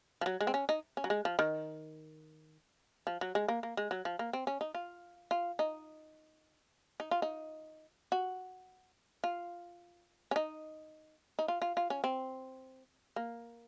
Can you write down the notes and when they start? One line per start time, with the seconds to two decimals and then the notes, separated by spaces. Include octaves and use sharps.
0.21 F3
0.26 F#3
0.41 G#3
0.47 C4
0.54 C#4
0.69 D#4
0.97 C#4
1.04 F#3
1.10 G#3
1.25 F3
1.39 D#3
3.07 F3
3.21 F#3
3.35 G#3
3.48 A#3
3.63 A#3
3.77 G#3
3.91 F#3
4.05 F3
4.19 A#3
4.33 C4
4.47 C#4
4.61 D#4
4.75 F4
5.31 F4
5.59 D#4
7.00 D#4
7.11 F4
7.22 D#4
8.12 F#4
9.24 F4
10.31 C#4
10.36 D#4
11.39 D#4
11.48 F4
11.62 F4
11.77 F4
11.90 C#4
12.04 C4
13.16 A#3